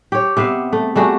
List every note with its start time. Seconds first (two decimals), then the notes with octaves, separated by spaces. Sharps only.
0.12 G4 C#5
0.37 C3 B3 E5 F5
0.73 A3
0.95 G3 A3 F#4 G#4